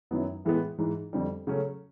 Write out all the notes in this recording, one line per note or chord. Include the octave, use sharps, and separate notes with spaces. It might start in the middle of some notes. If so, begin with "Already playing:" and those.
F#2 D#3 F#3 B3 E4
A2 E3 G#3 B3
G#2 E3 G#3
F2 D3 G3
C#3 F#3 A3 C#4